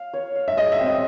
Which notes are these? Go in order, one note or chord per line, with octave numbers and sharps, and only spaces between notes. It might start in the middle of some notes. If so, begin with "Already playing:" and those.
Already playing: F5
C#5
F5
E5
G#3 D#5
E5
C4
D#5